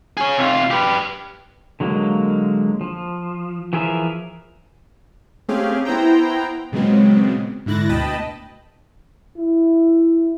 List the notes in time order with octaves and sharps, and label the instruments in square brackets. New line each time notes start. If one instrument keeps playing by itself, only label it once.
[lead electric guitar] G#4 C#5
C3 F4
G4 B4
[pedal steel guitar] D3 F#3 G#3 A#3
F3
E3 F3 G#4 A#4 E5
[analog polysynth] A3 C4 C#4 G4 G#4 F5
B3 E4 C5 G5 A#5
A#2 C#3 F#3 G#3 B3 C4
G#2 D3 E4 F#6 A6 A#6
D2 B2 D#5 G5 A5 B5
[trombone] E4